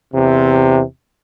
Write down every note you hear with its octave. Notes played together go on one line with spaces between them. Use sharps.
E2 C3